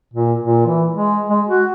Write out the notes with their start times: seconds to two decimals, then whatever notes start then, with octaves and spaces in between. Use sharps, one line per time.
0.14 A#2
0.44 A#2
0.67 E3
0.91 G#3
1.29 G#3
1.48 F#4